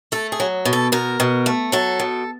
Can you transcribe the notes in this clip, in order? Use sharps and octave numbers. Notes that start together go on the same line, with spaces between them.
A3 A4
G#4
F#3
B2
A4
B2 A#4
B2
A3
F#3 A4
B2